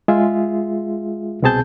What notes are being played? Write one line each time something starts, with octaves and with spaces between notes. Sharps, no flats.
G#3 F4 G#4 E5
C2 B2 C4 G#4 A5 G6